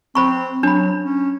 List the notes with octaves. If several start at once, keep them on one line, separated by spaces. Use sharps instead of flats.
C4 C5 B5 C#6
F#3 D4 B5
C#4